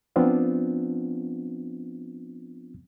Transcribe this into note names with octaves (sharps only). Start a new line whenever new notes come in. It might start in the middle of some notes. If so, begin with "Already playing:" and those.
F3 B3 C4 D4 F4